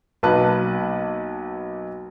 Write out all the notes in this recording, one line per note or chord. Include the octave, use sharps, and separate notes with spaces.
B1 A#3 B4 A5 F#6